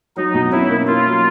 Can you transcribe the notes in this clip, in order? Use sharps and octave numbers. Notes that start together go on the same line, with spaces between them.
F#3 D#4
B2
C#4 E4
A#3
A#3 F4
F#3